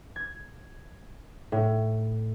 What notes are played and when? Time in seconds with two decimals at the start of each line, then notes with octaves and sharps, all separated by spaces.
0.16 G#6
1.52 A2